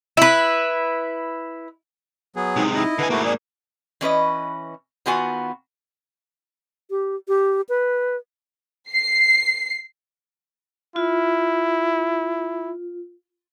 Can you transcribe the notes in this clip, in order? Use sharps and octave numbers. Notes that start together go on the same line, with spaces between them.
E4 B4
F#3 B3 G#4
C3 G#3 D#4
D#4 E4 D#5
D3 B4 G#5
G#2 A3 A#3 E4 F#4
G#4 D5
E3 C#4 B4 D#5
D#3 B3 F4 F#4 G#5
G4
G4
B4
C7
E4 F4